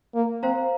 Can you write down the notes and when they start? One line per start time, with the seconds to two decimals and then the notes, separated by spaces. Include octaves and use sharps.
0.15 A#3
0.43 C4 C5 F5 A#5